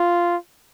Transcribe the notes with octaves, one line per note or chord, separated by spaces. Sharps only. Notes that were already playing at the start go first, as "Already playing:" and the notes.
Already playing: F4